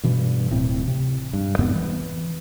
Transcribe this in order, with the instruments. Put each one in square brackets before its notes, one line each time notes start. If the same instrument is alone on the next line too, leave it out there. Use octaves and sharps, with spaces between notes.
[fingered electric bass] G2 B2 E3
D1 A2 C4
C3
G2
F2 G#2 C3 B3
E3